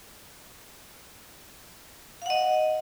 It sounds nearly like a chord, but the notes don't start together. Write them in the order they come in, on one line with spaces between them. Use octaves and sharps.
F5 F#5 D#5